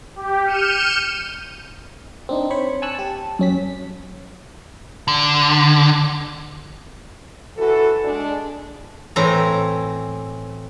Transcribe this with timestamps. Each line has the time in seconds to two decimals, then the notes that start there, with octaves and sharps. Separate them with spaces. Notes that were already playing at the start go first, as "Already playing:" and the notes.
0.15 G4
0.45 F6 G6 C#7 D#7 E7
2.29 C4 D4 D#4
2.50 C5 C#5 B5 C#6
2.82 G#5 A5 C#6 E6 F#6
2.95 G4 A5
3.39 F#2 C#4 B6
5.08 D3
7.58 E3 F#4 A4
8.05 G#3 D4
9.16 A2 E3 C4 A#5